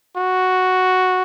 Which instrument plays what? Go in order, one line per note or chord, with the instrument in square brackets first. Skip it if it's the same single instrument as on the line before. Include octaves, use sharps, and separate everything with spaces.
[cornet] F#4